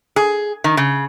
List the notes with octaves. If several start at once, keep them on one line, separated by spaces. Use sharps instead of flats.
G#4
D#3
C#3